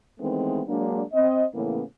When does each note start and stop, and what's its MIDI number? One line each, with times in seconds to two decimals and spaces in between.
0.18 0.61 51
0.18 0.61 52
0.18 0.61 56
0.18 0.61 57
0.18 0.61 59
0.18 0.61 60
0.67 1.02 54
0.67 1.02 56
0.67 1.02 58
0.67 1.02 62
1.14 1.44 60
1.14 1.44 75
1.54 1.81 45
1.54 1.81 49
1.54 1.81 52
1.54 1.81 58
1.54 1.81 59
1.54 1.81 61